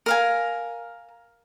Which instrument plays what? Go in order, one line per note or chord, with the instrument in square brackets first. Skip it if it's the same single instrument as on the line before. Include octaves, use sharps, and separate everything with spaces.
[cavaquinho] A#4 F5 G#5